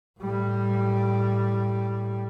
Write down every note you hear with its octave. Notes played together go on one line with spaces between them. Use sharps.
A2 G3